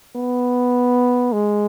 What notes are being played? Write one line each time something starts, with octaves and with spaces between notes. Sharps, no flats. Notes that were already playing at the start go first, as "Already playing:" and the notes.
B3
G#3